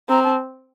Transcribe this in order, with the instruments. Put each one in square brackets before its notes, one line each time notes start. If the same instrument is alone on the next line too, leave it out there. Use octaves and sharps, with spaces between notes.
[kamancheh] C4 [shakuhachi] A#5
[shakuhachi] A5